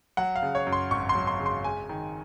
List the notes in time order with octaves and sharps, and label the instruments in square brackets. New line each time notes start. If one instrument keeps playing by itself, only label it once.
[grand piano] F#3 F#5
F5
C#3
C#5
F#2
C6
G#1 C#6
C6
F#3
C6
C#3
C6
G#3 G#5
D#3